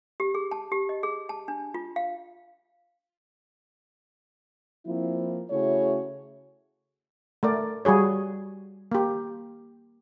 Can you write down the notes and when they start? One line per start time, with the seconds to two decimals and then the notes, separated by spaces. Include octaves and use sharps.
0.20 G4
0.35 G#4
0.51 A5
0.72 G4
0.89 D#5
1.03 G#4
1.29 A5
1.48 D4
1.74 F4
1.96 F5
4.86 F3 A#3 C4 E4
5.50 C#3 A3 E4 F#4 G#4 C#5
7.43 A3 A#4 D5
7.85 G3 F#4 G#4 C#5
8.92 A#3 G4